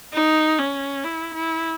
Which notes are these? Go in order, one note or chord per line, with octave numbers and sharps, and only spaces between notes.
D#4
C#4
E4
E4